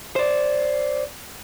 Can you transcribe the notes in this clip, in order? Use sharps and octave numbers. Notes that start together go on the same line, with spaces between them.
C5 D5